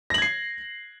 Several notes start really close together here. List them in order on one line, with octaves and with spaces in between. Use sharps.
A#6 F#7 G#6 C7